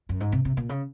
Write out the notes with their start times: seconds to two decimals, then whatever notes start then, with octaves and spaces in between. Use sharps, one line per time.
0.09 F#2
0.20 G#2
0.32 C3
0.45 C3
0.57 A#2
0.69 C#3